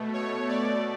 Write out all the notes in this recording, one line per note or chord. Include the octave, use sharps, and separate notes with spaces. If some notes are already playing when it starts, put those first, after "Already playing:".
Already playing: B2 A3
C#5
D5